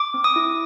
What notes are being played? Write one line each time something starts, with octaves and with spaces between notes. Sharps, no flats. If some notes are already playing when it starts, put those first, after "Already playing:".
Already playing: D6
C4
D#6
E4